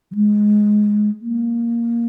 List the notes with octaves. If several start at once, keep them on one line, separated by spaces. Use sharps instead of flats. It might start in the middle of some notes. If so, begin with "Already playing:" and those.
F3
G#3
A#3